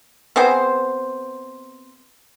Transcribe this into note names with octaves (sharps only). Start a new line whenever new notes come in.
B3 C4 G#4 C5